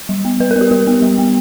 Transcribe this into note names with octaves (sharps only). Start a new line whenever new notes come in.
G3
B3
G3 B4
A#4
B3
G4
G3 G4
B3
G3
B3